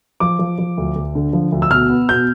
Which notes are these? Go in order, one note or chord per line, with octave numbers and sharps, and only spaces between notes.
F3 D6
F3
F3
D2
D2
D3
F3
D2
E6
B2 F6
B3
B2 G6